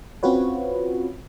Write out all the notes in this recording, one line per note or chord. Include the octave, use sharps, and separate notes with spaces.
C4 C#4 F4 F#4 B4 C#5